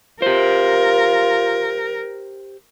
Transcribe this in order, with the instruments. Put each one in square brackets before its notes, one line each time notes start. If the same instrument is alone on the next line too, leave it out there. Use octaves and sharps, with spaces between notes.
[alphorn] F4 [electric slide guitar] G4 C5 [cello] A#4